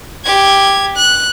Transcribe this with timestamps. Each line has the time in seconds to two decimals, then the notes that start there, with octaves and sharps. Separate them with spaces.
0.24 G4 G#6
0.97 F#6